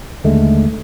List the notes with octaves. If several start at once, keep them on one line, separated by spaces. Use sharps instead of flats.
D#2 D3 G#3 A3